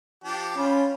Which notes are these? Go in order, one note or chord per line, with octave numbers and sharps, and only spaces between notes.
F3 D4 G4
C#4 F4 B5